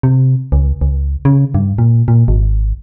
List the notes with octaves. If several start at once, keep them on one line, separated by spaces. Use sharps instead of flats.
C3
C#2
C#2
C#3
G2
A#2
A#2
G#1